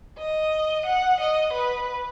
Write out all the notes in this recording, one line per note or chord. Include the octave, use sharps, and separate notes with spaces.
D#5
F#5
D#5
B4